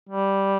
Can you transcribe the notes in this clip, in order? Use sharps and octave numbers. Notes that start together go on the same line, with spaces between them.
G3